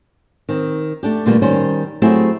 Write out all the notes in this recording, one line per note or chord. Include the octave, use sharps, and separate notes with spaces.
D#3 C4
A3 D4 G4
A#2 D3 E3 G3 A3 A#3
D#3 G3 C#4 C5
F#3 A3 C4 E4 G4 G#4